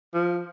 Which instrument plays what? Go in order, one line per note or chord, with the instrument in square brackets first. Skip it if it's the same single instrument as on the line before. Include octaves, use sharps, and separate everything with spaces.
[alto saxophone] F3